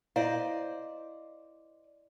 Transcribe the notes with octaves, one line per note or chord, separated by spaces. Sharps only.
E4 C5 D5 D#5 F5